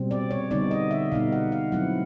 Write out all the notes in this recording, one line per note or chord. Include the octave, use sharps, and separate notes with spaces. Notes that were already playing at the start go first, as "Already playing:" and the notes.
Already playing: B2 G3 C4
D5
C#5
D3 G3 B3 D#4 D5
D#5
E5
B2 G3 B3 D#4 F5
F#5
F5
F#3 A3 C4 E4 F#5